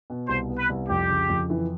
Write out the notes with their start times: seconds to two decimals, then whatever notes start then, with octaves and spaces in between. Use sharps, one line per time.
0.10 B2
0.29 C2 C5
0.49 B3
0.59 B4
0.69 C2
0.89 F2 G4
1.09 C#3
1.29 F2
1.50 E3